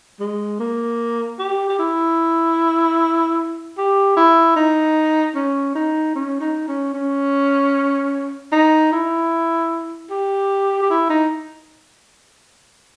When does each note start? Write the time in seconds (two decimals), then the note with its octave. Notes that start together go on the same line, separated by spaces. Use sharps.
0.20 G#3
0.60 A#3
1.39 G4
1.69 G4
1.79 E4
3.78 G4
4.17 E4
4.56 D#4
5.35 C#4
5.75 D#4
6.15 C#4
6.41 D#4
6.68 C#4
6.94 C#4
8.52 D#4
8.93 E4
10.10 G4
10.82 G4
10.90 E4
11.10 D#4